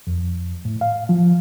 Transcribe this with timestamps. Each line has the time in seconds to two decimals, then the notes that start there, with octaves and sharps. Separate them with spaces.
0.07 F2
0.65 A2
0.81 F5
1.09 F3